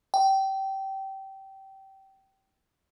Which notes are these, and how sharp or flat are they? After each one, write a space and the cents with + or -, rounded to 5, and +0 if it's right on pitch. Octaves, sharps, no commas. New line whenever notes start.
G5 -20